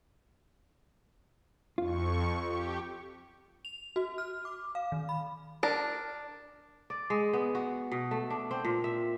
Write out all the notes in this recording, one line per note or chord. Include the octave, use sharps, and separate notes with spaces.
F2 F4 C#6
G4
F7
F#4
F6
D6
F5
D#3
B5
D4 A#4
D5
G#3
B3
F#4
B2
A3
D4
C4
A#2
E5